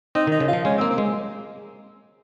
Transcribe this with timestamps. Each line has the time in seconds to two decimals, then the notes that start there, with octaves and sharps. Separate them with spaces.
0.15 C4 D#4
0.27 D#3 D#4
0.40 C#3
0.48 F4
0.53 F3
0.65 G#3 C#4
0.78 A#3 C4
0.90 C4
0.98 G#3